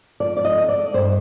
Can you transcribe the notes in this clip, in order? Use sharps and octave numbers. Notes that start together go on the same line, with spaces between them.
F3 D5
D5
D#5
D3
D5
G2 C5